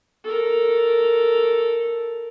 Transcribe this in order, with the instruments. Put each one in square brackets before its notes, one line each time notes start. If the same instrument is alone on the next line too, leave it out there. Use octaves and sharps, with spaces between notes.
[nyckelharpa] A4 A#4